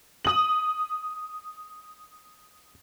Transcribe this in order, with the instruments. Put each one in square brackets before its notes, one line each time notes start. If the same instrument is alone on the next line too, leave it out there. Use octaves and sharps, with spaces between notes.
[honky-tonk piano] D#6 F#7